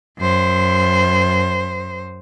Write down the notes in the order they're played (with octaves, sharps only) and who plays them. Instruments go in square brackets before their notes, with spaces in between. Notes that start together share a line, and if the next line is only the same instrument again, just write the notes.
[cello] F#2 C5